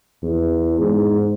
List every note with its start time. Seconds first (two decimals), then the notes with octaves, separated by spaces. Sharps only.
0.23 E2
0.80 G#2